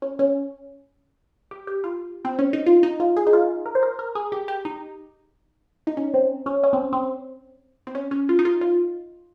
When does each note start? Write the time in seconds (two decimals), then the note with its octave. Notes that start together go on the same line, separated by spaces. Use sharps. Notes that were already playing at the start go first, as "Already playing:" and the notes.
0.02 C#4
0.19 C#4
1.51 G4
1.67 G4
1.84 F4
2.25 C4
2.39 C#4
2.53 D#4
2.66 F4
2.83 D#4
3.00 F4
3.17 G#4
3.27 D#4
3.33 F4
3.66 A#4
3.75 C5
3.83 A#4
3.99 A#4
4.15 G#4
4.32 G4
4.48 G4
4.65 D#4
5.87 D#4
5.97 C#4
6.14 C4
6.46 C#4
6.63 C#4
6.73 C4
6.93 C4
7.87 C4
7.95 C#4
8.11 C#4
8.29 F4
8.39 D#4
8.45 F4
8.61 F4